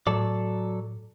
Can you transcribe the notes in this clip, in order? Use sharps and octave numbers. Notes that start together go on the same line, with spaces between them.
A2 F#3 A4 D5